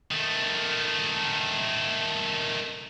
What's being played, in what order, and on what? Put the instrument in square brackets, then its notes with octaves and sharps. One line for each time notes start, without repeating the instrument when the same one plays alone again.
[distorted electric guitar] D#3 A3